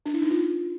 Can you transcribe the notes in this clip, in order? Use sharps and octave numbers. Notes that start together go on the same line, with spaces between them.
D4
E4
D#4
F4